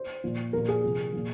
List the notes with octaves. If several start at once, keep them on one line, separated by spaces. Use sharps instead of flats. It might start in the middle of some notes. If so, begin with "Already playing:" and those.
Already playing: C5
A#2 F3
A#2 F3 A#4
G#4
C3 F3
A#2 F3